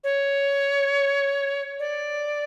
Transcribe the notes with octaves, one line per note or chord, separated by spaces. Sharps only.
C#5
D5